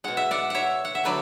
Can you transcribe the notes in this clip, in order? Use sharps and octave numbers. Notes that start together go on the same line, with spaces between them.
B2 G#3 F#5
E5
D5 F#5
C#5 E5 F#5
F#5
E5
D3 F#3 A3 B4 D5